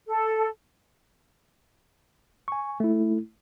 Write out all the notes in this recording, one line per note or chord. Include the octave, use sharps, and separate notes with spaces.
A4
G#5 C#6
A3 E4